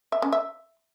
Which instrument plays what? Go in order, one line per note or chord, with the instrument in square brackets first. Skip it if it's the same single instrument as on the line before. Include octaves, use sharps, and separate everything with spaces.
[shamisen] E5
C#4
E5